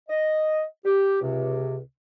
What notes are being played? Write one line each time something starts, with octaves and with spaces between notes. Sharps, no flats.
D#5
G4
C#2 C3